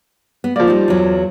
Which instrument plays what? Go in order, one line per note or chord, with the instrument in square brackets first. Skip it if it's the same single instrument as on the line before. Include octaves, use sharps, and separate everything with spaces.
[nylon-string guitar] B3
[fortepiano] F3 D5 [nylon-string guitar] A#3
[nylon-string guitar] G3 D#4
E2 F#3